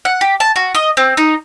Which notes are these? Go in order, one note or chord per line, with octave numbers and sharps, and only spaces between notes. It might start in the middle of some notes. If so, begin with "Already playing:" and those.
F#5
G4
A5
F#4
D#5
C4
D#4